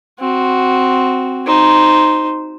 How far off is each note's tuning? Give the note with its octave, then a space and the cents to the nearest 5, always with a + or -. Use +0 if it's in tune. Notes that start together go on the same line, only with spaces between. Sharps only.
C4 +0 F#4 +0
D#4 +0 C5 +0